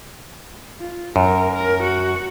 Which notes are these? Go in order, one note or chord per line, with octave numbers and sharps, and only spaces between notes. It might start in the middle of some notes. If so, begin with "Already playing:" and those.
F4
F#2 A#4
A#4
F#4